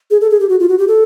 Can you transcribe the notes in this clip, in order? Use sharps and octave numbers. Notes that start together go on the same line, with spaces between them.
G#4
A4
G#4
G4
F#4
F4
F#4
G4
A4